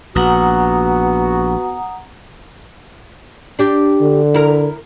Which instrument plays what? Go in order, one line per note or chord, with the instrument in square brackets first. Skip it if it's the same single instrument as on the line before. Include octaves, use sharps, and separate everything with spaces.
[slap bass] A#1 [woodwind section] B3 F#4 [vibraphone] F#5 A#5 D#6
[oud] D4 G4
[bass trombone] D3
[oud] E4 A#4